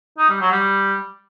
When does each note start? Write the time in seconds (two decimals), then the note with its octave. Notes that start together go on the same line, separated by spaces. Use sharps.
0.18 D#4
0.29 G3
0.40 F#3
0.51 G3